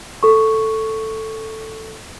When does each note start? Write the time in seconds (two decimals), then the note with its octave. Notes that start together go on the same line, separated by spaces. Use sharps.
0.23 A4 C#6